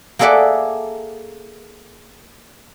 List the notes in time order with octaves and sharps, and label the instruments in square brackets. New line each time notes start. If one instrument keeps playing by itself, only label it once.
[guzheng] A#3 G#4 A4 D5 E5 F#5